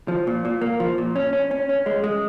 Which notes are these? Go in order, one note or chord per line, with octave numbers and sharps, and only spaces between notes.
F3
A#2
A#2
A#3
F3
A#2
C#4
C#4
C#4
C#4
G#3
G#3